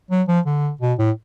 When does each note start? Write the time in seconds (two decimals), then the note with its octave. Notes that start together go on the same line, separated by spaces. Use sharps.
0.11 F#3
0.28 F3
0.46 D3
0.81 B2
0.99 A2